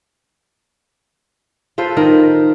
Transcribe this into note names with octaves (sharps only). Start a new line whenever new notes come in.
F4 A4 B4 C5
D#3 A#4